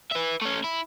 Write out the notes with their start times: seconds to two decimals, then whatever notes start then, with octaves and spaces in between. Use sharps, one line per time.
0.12 B4 E5
0.42 A3 C#4
0.64 E4